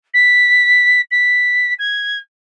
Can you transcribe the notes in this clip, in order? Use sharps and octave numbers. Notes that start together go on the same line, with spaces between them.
B6
B6
G#6